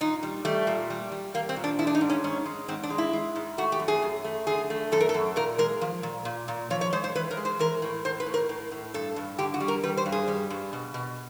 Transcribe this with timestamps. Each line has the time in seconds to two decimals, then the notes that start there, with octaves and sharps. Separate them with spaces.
0.01 A#2 D#4
0.23 G3
0.45 G3 A3
0.67 A#2
0.90 G3
1.12 G3
1.34 G3 A#3
1.49 C4
1.56 A#2
1.64 D4
1.79 G#3 E4
1.87 D4
1.95 D#4
2.01 G#2
2.10 C#4
2.24 G#2 C#4
2.46 G#3
2.68 G#2 C4
2.83 D4
2.90 G#3
2.98 E4
3.13 G#3
3.36 G#2
3.58 A3 F#4
3.72 G4
3.80 F#2
3.88 G#4
4.02 F#2
4.24 A3
4.47 D3 G#4
4.70 A3
4.92 F#2 A4
5.01 A#4
5.09 A4
5.14 F#2
5.36 A#2 A#4
5.58 G#3 A#4
5.81 F3
6.03 A#2
6.25 A#2
6.48 A#2
6.70 F3 C#5
6.81 C#5
6.93 G#3 C5
7.04 C5
7.15 E3 B4
7.31 A#4
7.37 G#3
7.45 C5
7.59 E3 A#4
7.82 A2
8.05 A2 C5
8.20 B4
8.26 A2
8.34 A#4
8.49 A2
8.71 A2
8.94 G2 A4
9.16 G2
9.39 D3 G4
9.54 F#4
9.60 G3
9.68 A#4
9.83 G3 B4
9.97 C5
10.06 G2
10.12 G#4
10.28 G3
10.50 G2
10.73 B2
10.94 B2